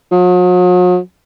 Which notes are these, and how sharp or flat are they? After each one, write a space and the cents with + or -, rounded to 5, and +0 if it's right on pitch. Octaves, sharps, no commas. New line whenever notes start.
F#3 -45